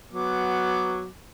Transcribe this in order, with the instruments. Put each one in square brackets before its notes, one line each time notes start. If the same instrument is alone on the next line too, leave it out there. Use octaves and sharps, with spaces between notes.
[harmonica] F#3 B3 D6